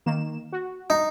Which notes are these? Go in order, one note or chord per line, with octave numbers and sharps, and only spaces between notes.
D#3 A#3 E7
F#4
D#4